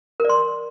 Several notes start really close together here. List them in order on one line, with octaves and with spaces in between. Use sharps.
A#4 D5 C6